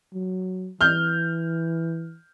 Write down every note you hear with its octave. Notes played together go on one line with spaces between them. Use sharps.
F#3
E3 F6 G6